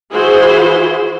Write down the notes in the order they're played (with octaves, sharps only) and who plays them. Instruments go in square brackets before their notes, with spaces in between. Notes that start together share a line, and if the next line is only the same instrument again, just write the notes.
[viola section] E3 E4 F#4 G#4 C5